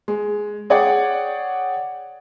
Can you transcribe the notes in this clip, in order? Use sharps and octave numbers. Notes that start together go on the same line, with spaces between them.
G#3
G#4 C#5 D5 F#5 G5